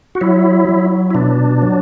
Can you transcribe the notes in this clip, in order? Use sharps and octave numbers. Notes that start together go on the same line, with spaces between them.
F#4
F#3 E4
F#3
E4
B2 D4
F#3